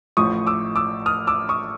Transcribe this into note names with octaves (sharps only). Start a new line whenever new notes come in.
A1 A2 F3 C#6 D#6
D6 E6
D6 E6
D#6 F6
D6 E6
C#6 D#6